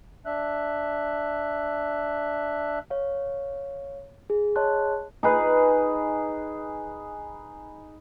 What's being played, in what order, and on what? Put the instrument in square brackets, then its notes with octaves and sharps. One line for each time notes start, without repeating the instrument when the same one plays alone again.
[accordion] D4 E5 F#6
[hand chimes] C#5 F5
G#4
G#4 C#5 D#5 A5 C6 F#6
[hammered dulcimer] D#4 G#4 B4